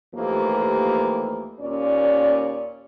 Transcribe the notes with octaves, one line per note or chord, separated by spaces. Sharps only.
D#2 E3 F3 A3 A#3 G4
D#2 A#2 C#4 D5